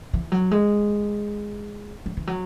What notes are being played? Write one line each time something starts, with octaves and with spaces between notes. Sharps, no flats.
E3
F#3
G#3
F#3
E3
F#3